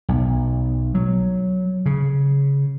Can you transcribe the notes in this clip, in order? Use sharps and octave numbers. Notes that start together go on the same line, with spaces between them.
B1
F#3
C#3